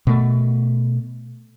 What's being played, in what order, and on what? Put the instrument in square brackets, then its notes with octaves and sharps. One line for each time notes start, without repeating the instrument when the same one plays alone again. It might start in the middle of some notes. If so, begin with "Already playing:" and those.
[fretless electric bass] B2 A3